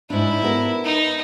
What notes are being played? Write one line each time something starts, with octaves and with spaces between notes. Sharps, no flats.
G#2 D4 E4
B3 A#4
D#4